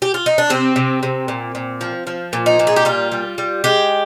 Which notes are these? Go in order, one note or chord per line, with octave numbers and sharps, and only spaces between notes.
G4
F4
D#4
D4
C3 C4
C3
C3
A#2
A#2
F3
F3
A#2
D#4
A#2
G#4
G4
G3 F4
G3
G3
G#3 G4